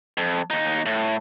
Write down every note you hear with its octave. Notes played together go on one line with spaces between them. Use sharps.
F2
D#2 D#4
A2